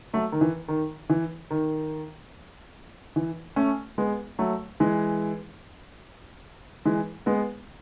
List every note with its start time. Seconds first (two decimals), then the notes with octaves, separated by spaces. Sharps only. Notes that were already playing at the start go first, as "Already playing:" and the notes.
0.13 F#3 A3
0.32 D#3
0.41 E3
0.68 D#3
1.09 E3
1.51 D#3
3.16 E3
3.56 A3 C#4
3.98 G#3 B3
4.39 F#3 A3
4.80 E3 G#3
6.85 E3 G#3
7.26 G#3 B3